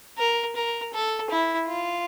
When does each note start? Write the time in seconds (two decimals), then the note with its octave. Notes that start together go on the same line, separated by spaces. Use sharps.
0.18 A#4
0.55 A#4
0.93 A4
1.30 E4
1.68 F4